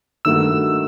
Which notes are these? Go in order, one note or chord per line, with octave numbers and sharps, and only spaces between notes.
G2 D#3 A3 D#4 F#4 E6